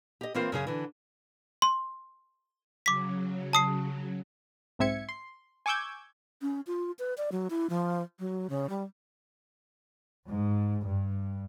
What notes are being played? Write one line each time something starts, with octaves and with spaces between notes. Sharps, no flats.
G4 D#5
E3 A#3 C4 F4 A#4 C5
F#2 C#3 G#4
D3 E3
C6
C#3 F#3 D6 B6
A5 D#6 C7
B1 G#2 C4 E5 G#6 C#7
C6
G#5 C#6 D6 E6 G6 G#6
C#4
F4
B4
D5
F#3
E4
F3
F#3
C#3
G3
G#2
G2